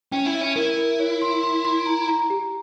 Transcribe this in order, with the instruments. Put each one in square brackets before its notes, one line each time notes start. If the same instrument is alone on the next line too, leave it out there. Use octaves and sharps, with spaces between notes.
[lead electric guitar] C#4 [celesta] G5
[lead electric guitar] E4
[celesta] E5
[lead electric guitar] C#4
[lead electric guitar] E4 [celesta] A#4
[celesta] A#4
C#5
C6
C6
C6
A#5
A#5
G4